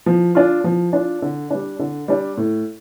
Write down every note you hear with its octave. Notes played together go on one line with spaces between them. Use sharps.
F3
D4 F4
F3
D4 F4
D3
G3 D4
D3
G3 D4
A2